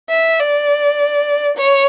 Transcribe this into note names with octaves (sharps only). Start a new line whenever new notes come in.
E5
D5
C#5